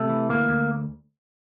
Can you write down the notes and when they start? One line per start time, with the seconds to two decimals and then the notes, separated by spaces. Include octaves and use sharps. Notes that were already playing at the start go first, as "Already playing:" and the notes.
Already playing: C3 A3
0.09 E3
0.29 D2 A#3
0.49 D2